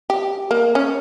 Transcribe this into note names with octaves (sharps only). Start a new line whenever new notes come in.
G4
A#3
C#4